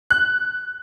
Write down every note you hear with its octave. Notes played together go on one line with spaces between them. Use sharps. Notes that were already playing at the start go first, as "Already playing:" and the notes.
F#6